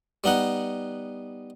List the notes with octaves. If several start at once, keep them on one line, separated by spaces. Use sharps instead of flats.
G3 B3 D#4 F#5